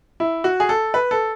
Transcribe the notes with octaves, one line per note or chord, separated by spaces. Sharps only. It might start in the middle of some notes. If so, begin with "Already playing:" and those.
E4
F#4
G#4
A4
B4
A4